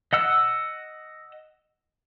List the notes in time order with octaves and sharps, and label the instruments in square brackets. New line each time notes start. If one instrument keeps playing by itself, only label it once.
[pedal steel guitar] D#5 F#5 E6